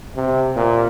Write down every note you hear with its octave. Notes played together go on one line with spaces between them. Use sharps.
C3
A#2